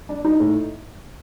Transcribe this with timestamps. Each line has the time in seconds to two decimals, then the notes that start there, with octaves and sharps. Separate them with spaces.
0.09 D4
0.25 D#4
0.40 A2